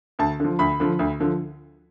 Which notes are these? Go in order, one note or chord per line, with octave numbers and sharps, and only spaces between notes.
D2 A5
D3 F3
D2 B5
D3 F3
D2
D3 F3